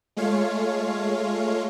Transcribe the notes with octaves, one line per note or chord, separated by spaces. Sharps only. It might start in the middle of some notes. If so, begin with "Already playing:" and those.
G#3 A3 F4 C#5 F5